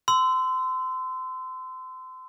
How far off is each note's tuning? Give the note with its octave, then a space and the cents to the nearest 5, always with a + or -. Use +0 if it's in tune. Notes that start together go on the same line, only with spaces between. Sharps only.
C6 -30 E6 +0